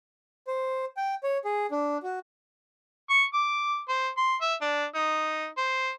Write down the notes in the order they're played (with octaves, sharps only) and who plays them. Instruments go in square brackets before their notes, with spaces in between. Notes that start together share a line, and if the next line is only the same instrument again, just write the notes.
[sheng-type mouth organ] C5
G5
C#5
G#4
D4
F#4
[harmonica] C#6
D6
C5
C6
E5
D4
D#4
C5